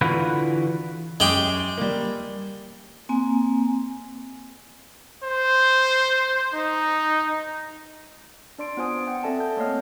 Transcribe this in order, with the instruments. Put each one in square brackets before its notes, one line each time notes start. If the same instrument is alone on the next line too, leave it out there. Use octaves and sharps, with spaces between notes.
[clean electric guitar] D3 E3 F4 F#4 B4
[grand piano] F#2 G5 [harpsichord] G#3 G4
[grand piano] G3 A#3
[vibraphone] A#3 C4 G#5
[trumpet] C5
D#4
[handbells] D4 D5 C6 D7
B3 F4 C5 G#5 D#6 D7
F#5 G5
C4 A4 D5 E5 G#5 A5
A5 G6
A3 A#3 C#5 D#5 F5 F6